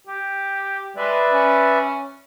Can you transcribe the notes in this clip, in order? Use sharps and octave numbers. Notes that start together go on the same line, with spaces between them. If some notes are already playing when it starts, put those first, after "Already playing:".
G4
G#3 B4 D5 E5
C#4